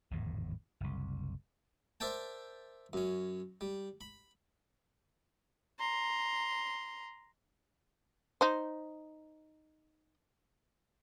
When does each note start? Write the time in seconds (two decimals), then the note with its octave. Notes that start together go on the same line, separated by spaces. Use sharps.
0.11 D1 G#1 E2 A2
0.80 F#1 C2
2.00 A#4 C5 D5 E5 G5 A5
2.93 F#2 C#4
3.61 G3
4.01 B5
5.79 A#5 C6
8.41 D#4 C5